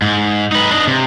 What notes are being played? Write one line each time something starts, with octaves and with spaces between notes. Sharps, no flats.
G#2
D#4 B4
D4 D#5
C3